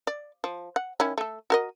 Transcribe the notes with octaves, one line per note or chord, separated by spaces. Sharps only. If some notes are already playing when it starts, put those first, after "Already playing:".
D5
F3
F#5
D#3 C#4 E4
A3 A4
F#4 A#4 D#5